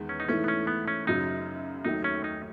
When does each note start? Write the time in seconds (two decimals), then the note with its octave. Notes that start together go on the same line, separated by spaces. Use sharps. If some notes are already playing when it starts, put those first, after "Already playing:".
Already playing: E2 D#3 G#3 B3
0.09 C#4
0.20 D#4
0.28 G#2 E3 A3 C#4
0.44 B3
0.48 C#4
0.67 B3
0.88 C#4
1.07 F#2 C#3 F#3 D#4
1.85 D#2 D#3 F#3 A3 D#4
2.04 C#4
2.24 D#4